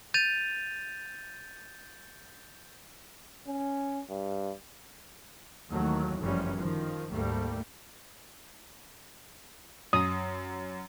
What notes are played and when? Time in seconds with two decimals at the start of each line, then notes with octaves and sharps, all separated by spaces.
0.14 G6 A6 D#7 F7
3.47 C#4
4.09 G2
5.70 D#2 D#3 E3 F#3 A3
6.21 G1 F#2 E3 F3 G3 C#4
6.57 D#3 F3
7.11 D2 G#2 G3 A3 A#3
9.93 F#2 D#6